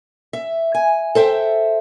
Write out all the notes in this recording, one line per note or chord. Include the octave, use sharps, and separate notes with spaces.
E5
G#5
A4 C5 E5 G5